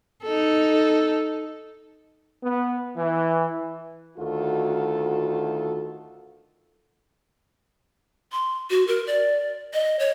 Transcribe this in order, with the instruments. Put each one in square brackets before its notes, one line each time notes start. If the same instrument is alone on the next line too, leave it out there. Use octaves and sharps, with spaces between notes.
[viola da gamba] D#4 A4
[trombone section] B3
E3
[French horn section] D2 D#3 F4 F#4 A4
[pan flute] C6
F#4
A#4
D5
D#5
C#5